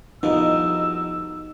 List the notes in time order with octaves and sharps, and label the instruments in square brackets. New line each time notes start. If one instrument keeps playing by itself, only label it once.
[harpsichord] C2 F2 B2 [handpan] D#4 [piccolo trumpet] E6